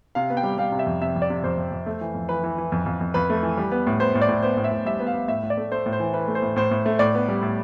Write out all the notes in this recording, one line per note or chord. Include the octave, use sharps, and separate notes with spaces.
C3 F5
B3
G5
G3
G3 F5
C3
E5
F2
C3 E5
F2
D5
C3
F2 C5
F2
F2
A3
E3
F2
E3 B4
E3
E3
F2
F2
F2
F2 B4
A3
E3
G3
B3
A2
B3 C5
A2
D5
A2
B3 C5
A2
E5
A2
G3 E5
B3
F5
B3
A2 E5
A2
D5
A3
A3 C5
A2
C5
E3
E3 B4
A3
C5
A2
A2 C5
A2
A3
A2 D5
B3
G3
A2